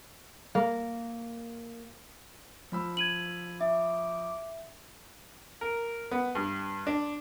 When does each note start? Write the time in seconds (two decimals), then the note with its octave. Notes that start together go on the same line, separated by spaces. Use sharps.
0.55 A#3
2.72 F3 B5 E6
2.97 G#6 D#7 F#7
3.61 E5 D6
5.61 A#4
6.11 B3
6.35 G2
6.87 D4